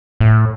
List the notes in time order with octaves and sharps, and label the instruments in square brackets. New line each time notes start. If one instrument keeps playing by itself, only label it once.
[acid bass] A2